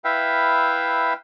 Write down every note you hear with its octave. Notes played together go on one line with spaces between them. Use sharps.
E4 B4 E5 F5 G5